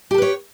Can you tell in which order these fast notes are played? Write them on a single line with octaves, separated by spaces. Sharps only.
G4 A4 B4 C#5